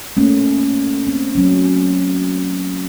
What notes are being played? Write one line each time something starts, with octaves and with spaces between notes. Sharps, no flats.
A3 A#3 C#4
C4
F#3 C#4